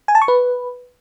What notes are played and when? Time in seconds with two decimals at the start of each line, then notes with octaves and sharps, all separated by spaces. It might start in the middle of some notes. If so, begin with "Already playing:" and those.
0.08 G#5
0.15 A5
0.22 C#6
0.28 B4